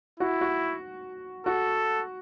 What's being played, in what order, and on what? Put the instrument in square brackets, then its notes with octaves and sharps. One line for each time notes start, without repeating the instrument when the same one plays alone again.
[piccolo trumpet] E4 [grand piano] F#4
[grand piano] F#4
[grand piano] F#4 [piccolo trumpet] A4